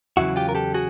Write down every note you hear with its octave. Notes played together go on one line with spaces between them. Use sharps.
E2 C#3 F#3 E4 F#4
F4 G4
A#4
G4 A4
F#4 G#4